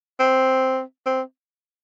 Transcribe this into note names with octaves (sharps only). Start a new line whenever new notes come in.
C4
C4